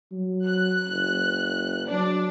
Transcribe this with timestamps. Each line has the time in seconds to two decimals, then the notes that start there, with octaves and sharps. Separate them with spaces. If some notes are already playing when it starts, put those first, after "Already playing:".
0.12 F#3
0.46 F#6
0.89 F#1
1.89 F#3 D4 D5